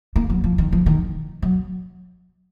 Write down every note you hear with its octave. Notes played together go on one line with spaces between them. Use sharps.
A#3
F#3
F3
D#3
F3
D#3
F#3